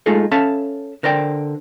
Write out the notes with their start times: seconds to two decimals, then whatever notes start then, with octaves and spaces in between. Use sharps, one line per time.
0.06 G#3 A3 D#4 F4 G#4 A4
0.32 C#4 A4 E5 F5 A5
1.03 D3 A#4 C5 D5 G5